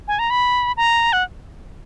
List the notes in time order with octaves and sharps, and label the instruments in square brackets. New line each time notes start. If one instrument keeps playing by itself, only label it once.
[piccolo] G#5
A#5
B5
A#5
F#5